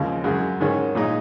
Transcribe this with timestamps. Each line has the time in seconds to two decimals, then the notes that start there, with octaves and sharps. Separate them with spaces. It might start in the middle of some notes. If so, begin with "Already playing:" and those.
Already playing: D#2 C#3 F3 G#3
0.24 F#2 C#3 G#3
0.60 G#2 D#3 G#3 C#4
0.95 A#2 G#3 D#4